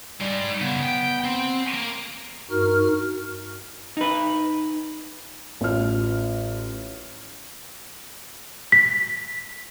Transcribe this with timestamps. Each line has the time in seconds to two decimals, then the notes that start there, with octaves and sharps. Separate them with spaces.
0.21 G3 G#3 D#4
0.61 C#3 F#3 B3
0.83 G5
1.25 C4
1.74 A#3
2.50 G2 D#4 F#4 A#4 F6
3.97 D#4 B4
5.61 A1 F4 F6
8.72 B6